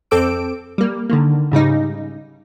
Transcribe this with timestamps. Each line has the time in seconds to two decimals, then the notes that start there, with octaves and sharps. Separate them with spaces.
0.11 F2 C4 A4 D6 E6 D7
0.78 G3 A#3
1.09 D3 D#3 A#3
1.51 G#2 C#3 G3 D#4